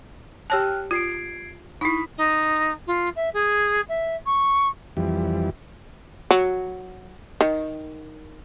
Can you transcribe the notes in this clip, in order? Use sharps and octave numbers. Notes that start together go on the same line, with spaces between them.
G4 C#5 G5 A5 F6 F#6
F4 G#6 C7 D7
D#4 E4 B5 D#6 B6
D#4
F4
E5
G#4
E5
C#6
F2 E3 G3
F#3
D#3